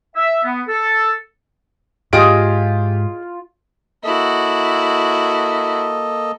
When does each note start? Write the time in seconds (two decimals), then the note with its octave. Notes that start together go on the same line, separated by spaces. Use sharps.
0.15 E5
0.44 B3
0.68 A4
2.13 G#2 F4 G4 G#4 D#5 D7
4.04 A#3 E4 F#4 A4 D#5